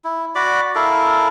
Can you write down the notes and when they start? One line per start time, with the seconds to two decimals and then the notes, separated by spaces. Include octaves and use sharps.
0.04 E4
0.35 F#4 D5 B5 D6
0.75 E4 A4 A#4 F5